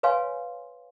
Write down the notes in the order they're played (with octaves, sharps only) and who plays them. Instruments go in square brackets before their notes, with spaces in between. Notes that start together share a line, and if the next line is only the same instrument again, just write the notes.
[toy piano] B4 C#5 F5 G#5 C6